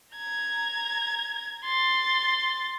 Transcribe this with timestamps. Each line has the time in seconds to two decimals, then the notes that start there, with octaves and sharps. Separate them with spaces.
0.16 A#5 G#6
1.64 C6 A6